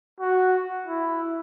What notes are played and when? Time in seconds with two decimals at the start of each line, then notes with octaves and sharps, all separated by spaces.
0.20 F#4
0.87 E4